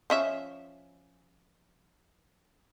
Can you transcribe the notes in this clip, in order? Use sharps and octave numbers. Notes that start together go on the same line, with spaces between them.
F3 C#4 E5